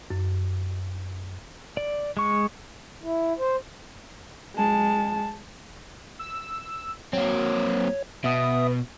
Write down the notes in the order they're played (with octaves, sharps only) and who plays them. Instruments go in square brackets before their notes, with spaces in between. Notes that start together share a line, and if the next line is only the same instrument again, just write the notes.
[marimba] F#2
[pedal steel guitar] D5
G#3 C#6
[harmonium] E4
C5
[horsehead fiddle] G#3 A5
[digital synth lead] E6
[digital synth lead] F#3 [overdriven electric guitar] A#3 C4 [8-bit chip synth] C#5
[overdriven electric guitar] B2 [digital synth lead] B3 [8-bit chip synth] E5 D#6